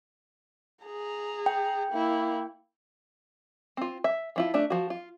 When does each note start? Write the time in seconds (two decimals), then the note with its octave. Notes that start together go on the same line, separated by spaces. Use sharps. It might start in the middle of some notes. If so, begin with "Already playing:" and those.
0.85 G#4 A#5
1.46 G5
1.91 A#3 E4
3.77 C4 F4
4.04 E5
4.36 F3 E4 F4
4.54 A3 D4 E5
4.70 F3 F#4
4.90 F4